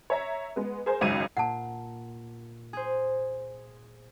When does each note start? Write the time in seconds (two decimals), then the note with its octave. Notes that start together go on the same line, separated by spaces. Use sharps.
0.10 C#5 E5 A#5
0.56 G#3 B3
0.86 G#4 A#4 C5
1.01 G#1 C#2 F#2 G#6 D#7
1.37 A#2 F#5 A5
2.73 G#4 C5